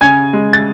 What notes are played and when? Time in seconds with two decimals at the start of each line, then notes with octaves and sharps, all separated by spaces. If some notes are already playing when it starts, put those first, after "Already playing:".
0.01 C#3 G#5 G#6
0.33 G#3
0.53 A6